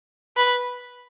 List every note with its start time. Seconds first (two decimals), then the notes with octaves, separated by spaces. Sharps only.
0.37 B4